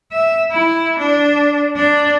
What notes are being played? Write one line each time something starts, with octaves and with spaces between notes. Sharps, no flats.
E5
E4
D4
D4